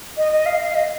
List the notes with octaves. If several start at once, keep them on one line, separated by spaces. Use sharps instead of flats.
D#5
D#5
F5
F5
D#5